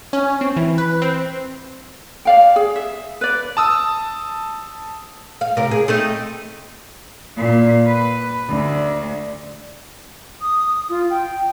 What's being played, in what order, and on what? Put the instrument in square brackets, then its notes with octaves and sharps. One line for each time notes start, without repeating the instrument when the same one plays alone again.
[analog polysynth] C#4
C4
E3
B4
C4
[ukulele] D5 F5 G5
G#4
E5
B4 D5
[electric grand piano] A5 D#6 E6
[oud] F5
A2 C3 A#4
G#4
A3 C4 D#4
[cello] A#2
B4
D2
[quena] D#6
F4
G5